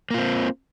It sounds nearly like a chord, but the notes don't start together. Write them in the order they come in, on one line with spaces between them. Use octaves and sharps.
A#3 F4 C4